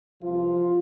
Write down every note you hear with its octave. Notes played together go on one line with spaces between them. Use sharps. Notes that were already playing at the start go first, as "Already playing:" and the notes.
C2 C3 E3 F3 F4